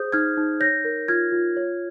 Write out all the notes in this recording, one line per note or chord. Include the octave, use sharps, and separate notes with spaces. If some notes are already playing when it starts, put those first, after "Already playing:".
Already playing: G#4 C5 D#6 G6
D#4 F6 G#6
D#4
C#5 G6 A#6
A#4
F4 F6 G#6
F4
C#5